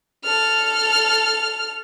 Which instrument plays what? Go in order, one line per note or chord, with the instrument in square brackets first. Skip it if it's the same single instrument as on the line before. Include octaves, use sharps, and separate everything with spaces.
[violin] A4 F6